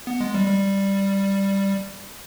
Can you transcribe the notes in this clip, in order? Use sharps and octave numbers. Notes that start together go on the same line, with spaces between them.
B3
G#3
G3
G3